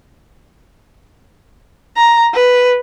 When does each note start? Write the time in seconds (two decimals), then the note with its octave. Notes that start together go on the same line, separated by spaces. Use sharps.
1.97 A#5
2.34 B4